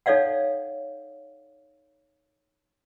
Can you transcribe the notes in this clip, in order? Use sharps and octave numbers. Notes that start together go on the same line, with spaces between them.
D#4 A4 C#5 D5 F5 F#5